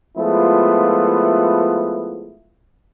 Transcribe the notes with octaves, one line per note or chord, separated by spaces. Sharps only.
F3 G#3 A3 B3 E4 F4